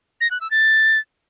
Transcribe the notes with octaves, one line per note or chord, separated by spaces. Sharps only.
A#6
F#6
E6
A6